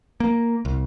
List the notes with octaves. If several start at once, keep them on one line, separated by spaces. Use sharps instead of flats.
A#3
C2